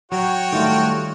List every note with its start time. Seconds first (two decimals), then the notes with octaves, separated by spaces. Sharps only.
0.12 F#3 F#4 C#5 G5
0.52 D#3 G3 A3 F4